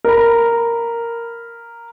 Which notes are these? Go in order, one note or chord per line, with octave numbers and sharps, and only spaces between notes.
A#4 B5